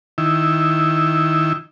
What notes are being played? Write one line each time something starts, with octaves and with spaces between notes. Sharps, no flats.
D#3 E4